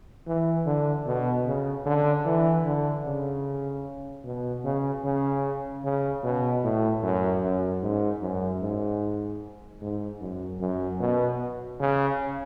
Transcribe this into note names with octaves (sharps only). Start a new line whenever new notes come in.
E3
D3
B2
C#3
D3
E3
D3
C#3
B2
C#3
C#3
C#3
B2
A2
F#2
F#2
G#2
F#2
G#2
G#2
F#2
F#2
B2
C#3